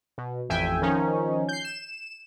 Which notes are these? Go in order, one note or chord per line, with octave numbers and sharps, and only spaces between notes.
B2
A1 F2 E5 G5 G#5
D#3 F3 C#4 D#4
G6 C7
E7